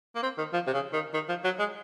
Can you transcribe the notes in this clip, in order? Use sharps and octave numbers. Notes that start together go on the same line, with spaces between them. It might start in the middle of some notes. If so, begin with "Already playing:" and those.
A#3
C4
D#3
F3
C3
C#3
D#3
D#3
F3
F#3
G#3